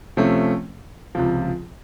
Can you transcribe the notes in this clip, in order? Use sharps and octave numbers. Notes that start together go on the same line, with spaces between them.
C3 F3 A3 C#4
C#2 C3 F3